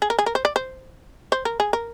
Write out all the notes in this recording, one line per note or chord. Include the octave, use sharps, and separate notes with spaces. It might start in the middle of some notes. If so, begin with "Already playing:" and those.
G#4
A#4
G#4
A#4
C5
D5
C5
C5
A#4
G#4
A#4